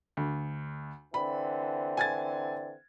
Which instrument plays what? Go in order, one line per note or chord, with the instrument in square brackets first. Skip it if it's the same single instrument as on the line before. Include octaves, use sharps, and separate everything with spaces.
[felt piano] D2
[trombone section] D3 E3 C4 [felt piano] B5
[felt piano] G#5 G#6 A6